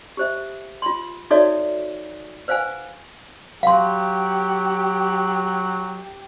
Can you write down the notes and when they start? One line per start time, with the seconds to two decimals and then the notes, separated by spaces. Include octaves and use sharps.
0.17 G4 C5 E5
0.82 F4 C6
1.31 D#4 F#4 A4 C#5 D5 E5
2.48 B4 C5 F5 F#5 G#5
3.63 F#3 G4 F5 C6